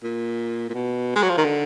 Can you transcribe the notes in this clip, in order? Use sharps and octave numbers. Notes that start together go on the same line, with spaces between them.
A#2
A#2
B2
G#3
F#3
F3
D#3
D3